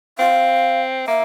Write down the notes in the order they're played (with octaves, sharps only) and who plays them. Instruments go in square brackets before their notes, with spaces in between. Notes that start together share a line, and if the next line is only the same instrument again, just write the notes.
[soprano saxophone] C4 [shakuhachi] F5
[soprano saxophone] A#3 [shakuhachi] E5